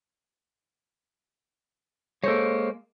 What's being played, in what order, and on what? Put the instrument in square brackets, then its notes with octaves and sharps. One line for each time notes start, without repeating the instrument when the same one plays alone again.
[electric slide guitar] G#3 A#3 [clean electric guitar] A4 C5 C#5